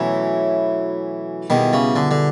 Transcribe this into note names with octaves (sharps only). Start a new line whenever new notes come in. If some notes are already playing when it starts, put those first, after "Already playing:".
Already playing: B2 E3 F#3 A3 C#4 E4
B2 D#3 G3 B3 E4 G#4
C#3
D3
D3